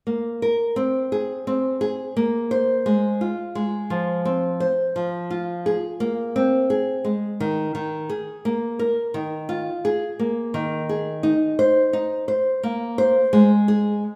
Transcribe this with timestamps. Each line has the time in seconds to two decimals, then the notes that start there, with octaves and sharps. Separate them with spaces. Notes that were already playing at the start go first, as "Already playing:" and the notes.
0.07 A#3
0.42 A#4
0.76 C4
1.12 G#4
1.47 C4
1.81 G#4
2.17 A#3
2.51 C5
2.86 G#3
3.21 F4
3.55 G#3
3.90 F3
4.25 C4
4.60 C5
4.96 F3
5.30 F4
5.66 G#4
6.00 A#3
6.36 C4
6.70 G#4
7.05 G#3
7.40 D#3
7.75 D#3
8.09 G#4
8.45 A#3
8.79 A#4
9.14 D#3
9.49 F4
9.85 G#4
10.19 A#3
10.54 D#3
10.89 G#4
11.23 D#4
11.59 C5
11.93 D#4
12.28 C5
12.63 A#3
12.98 C5
13.33 G#3
13.68 G#4